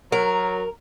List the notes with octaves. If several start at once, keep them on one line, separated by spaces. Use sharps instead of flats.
F#3 A#4